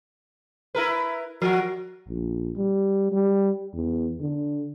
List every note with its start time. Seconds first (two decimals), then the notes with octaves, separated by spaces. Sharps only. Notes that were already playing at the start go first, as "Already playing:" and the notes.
0.75 E4 A#4 B4
1.42 F3 F#4 A#4
2.07 A#1
2.56 G3
3.12 G3
3.74 E2
4.20 D3